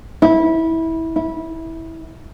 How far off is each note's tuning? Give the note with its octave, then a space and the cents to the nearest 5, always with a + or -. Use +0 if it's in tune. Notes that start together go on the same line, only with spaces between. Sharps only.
E4 -20
E4 -20